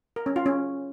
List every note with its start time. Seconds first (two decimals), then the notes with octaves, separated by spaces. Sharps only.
0.16 A#4
0.26 C#4
0.36 F4
0.46 C#4